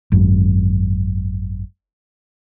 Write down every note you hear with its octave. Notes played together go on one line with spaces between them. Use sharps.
G#1 F#2